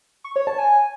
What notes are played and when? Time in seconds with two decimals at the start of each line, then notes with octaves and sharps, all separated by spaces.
0.24 C#6
0.36 C#5
0.47 A5
0.58 G#5